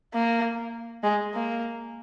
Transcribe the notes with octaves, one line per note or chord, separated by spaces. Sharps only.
A#3
G#3
A#3